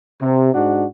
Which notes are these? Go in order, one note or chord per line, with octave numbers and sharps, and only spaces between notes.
C3
G#2 D4 F#4